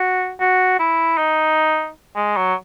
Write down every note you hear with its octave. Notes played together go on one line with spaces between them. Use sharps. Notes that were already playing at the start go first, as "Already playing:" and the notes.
Already playing: F#4
F#4
E4
D#4
G#3
F#3